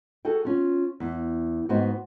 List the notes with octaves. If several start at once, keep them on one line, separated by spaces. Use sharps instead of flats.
F#4 G#4 A4 G5
C#4 F4
E2
G#2 B3 F#4 C5 D#5 G5